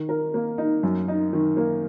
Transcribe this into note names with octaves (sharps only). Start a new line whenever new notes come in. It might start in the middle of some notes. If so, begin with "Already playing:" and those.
Already playing: D#3
A#4
A#3
D#4
F#2
D#4
D#3
A#3